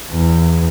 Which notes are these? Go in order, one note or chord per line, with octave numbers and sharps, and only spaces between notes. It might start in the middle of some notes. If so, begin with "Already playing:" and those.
E2